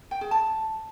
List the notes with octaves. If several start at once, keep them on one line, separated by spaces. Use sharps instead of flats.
G5
G#4
A5